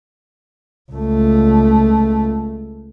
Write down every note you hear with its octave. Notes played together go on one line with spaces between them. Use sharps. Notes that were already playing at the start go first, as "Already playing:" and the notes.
C#2 A3